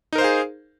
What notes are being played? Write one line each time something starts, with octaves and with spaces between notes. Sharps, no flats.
D#4 G#4 A#4 C5 F5